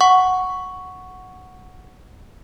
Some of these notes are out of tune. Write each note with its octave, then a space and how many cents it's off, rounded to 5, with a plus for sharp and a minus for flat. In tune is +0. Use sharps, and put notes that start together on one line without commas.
F#5 +0 C#6 +5